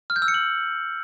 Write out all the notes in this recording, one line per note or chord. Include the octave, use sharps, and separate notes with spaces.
F6
G6
E6
C#7
F#7